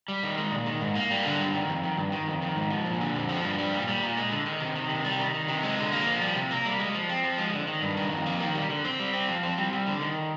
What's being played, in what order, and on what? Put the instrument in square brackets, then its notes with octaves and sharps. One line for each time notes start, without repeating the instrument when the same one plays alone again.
[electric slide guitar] G3
D#3
G#3
A#2
D#3
G#2
A#3
G3
D3
G2
D#3
F2
D#3
G2
D#3
F2
D#3
G#2
F3
A#2
D3
F2
F3
G2
G3
A#2
G3
A#2
G#3
D3
D#3
C3
D#3
C3
G3
D#3
D#3
C3
G#3
D3
A#3
F3
G3
C3
A#3
G3
G#3
F3
C4
F3
G#3
D3
D#3
G2
D#3
F2
A#3
D#3
G3
D3
C4
G3
C4
F3
C4
G3
G3
D3
D#3